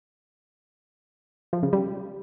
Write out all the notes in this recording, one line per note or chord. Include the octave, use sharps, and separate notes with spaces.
F3
C#3
G3